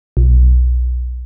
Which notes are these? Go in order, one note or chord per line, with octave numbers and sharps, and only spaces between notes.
B1